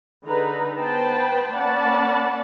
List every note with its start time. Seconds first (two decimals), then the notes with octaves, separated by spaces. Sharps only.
0.25 D3 D#4 G#4 B4 A#5
0.78 B3 C5 G5 A5 B5
1.55 A#3 C#4 D5 F#5 A5 B5